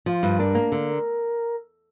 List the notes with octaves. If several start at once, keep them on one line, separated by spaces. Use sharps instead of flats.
F3 F4
G2
D4 A#4
A#3
D3